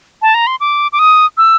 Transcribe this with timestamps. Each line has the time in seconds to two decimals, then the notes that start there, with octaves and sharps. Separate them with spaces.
0.22 A5
0.34 A#5
0.47 C6
0.60 D6
0.93 D6
0.99 D#6
1.38 E6